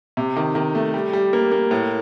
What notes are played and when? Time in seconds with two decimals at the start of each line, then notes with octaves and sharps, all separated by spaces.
0.17 C3
0.36 D#3
0.55 D#3
0.75 A3
0.94 G3
1.13 G3
1.33 A#3
1.52 A#3
1.71 A2